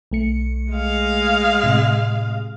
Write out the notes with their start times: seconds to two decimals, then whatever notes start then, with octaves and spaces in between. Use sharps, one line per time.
0.11 B1 A3 C#7
0.72 G#3 F5
1.63 A2 C3